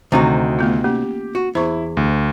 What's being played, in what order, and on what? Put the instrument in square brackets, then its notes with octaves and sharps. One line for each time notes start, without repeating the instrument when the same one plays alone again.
[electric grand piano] D2 [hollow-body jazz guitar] C3 D#4 F#4 [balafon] D#3 C4 C5
[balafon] A3 B3 F4
[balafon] A#3 C#4 [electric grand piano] G4
[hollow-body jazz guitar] F#4
[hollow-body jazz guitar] E2 [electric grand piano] E4 [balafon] C5 C#6
[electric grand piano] D2